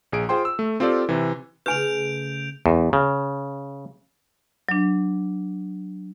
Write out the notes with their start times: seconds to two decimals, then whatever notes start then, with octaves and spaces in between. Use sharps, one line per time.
0.12 A#1 G#4 D7
0.29 F4 G#4 C5 G5 C6
0.45 E6
0.59 A3
0.80 C4 F4 G4 A4 D5
1.09 C3 E3
1.66 C#3 A3 B4 G#5 G6 D7 F7
2.66 E2
2.93 C#3
4.69 F#3 D4